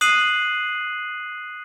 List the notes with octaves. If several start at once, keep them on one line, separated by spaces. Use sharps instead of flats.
D#6 F#6 C7 D#7 F#7